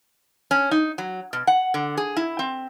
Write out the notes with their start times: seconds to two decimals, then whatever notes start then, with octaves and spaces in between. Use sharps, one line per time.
0.51 C#4
0.71 D#4
0.98 F#3
1.33 B2
1.47 F#5
1.74 D3
1.97 G#4
2.17 E4
2.39 C4